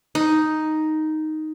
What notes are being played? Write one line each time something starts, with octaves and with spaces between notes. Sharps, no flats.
D#4